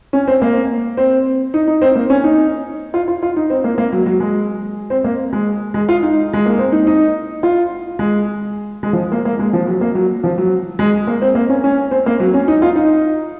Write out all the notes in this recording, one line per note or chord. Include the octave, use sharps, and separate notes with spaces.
C#4
C4
A#3
C4
D#4
D#4
C4
A#3
C#4
D#4
F4
F4
F4
D#4
C4
A#3
A#3
F#3
F#3
G#3
C4
A#3
G#3
G#3
F4
D#4
G#3
A#3
C4
D#4
D#4
F4
G#3
G#3
F3
A#3
A#3
G#3
F3
F#3
A#3
F#3
F3
F#3
G#3
A#3
C4
A#3
C#4
C#4
C4
A#3
F#3
C#4
D#4
F4
D#4